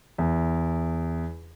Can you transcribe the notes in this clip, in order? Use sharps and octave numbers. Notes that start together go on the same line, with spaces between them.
E2